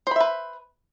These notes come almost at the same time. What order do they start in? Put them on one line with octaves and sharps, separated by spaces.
C5 B5 E5 B4